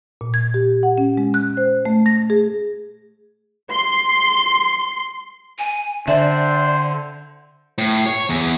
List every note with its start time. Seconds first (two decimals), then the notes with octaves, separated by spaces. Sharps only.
0.21 A#2
0.34 G#6
0.54 G4
0.83 F#5
0.98 C#4
1.17 G#3
1.34 F#6
1.57 C5
1.85 A3
2.06 A#6
2.30 G#4
3.70 C6
5.58 G#5
6.08 D3 C4 E4 C5 D5 E5
7.78 A2
8.06 C#5
8.30 E2